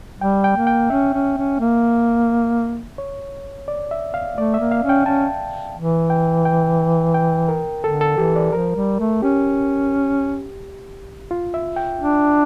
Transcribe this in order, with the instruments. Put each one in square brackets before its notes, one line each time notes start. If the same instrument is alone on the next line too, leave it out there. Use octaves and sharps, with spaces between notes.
[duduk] G3 [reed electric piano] G5
[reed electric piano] G5
[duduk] A#3
[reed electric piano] G5
[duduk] C#4 [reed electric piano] E5
[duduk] C#4
C#4
A#3
[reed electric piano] C#5
D5
E5
F5
[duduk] A3 [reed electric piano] D5
[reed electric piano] E5
[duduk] A#3
[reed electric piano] F5
[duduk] C#4
[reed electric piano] G5
[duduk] C#4 [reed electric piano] A5
[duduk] E3
[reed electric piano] G5
G5
G5
A#4
[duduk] D3 [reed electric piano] A4
[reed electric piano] A4
[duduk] E3 [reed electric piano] G4
[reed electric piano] D5
[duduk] F3 [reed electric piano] A#4
[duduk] G3
A3
[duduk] C#4 [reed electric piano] G4
[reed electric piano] F4
E5
G5
[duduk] D4